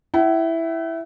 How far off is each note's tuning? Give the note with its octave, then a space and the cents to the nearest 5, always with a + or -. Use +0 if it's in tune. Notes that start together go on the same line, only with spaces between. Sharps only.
E4 +0 F#5 +45